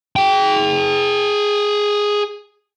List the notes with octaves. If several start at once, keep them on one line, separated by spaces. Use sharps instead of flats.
G#4 G5